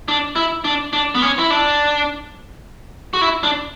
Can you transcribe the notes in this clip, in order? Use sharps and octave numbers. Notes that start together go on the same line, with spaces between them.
D4
E4
D4
D4
B3
C#4
E4
D4
F#4
E4
D4